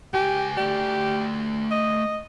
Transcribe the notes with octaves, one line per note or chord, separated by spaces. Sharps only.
C#2 G4 G#5
A3 G4 D5
D#5